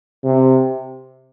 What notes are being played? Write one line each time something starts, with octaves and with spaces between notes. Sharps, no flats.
C3